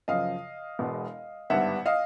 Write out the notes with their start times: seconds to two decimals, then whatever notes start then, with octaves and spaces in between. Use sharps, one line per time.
0.08 F#2 C#3 F3 D#5 F5
0.79 E1 E2 B2 G#3 B3
1.50 G#1 G2 D3 G3 B3 E5 F#5
1.86 D#5 F5